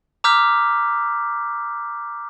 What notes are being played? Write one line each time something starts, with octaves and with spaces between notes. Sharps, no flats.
A#5 D6 E6 F6 G6 B6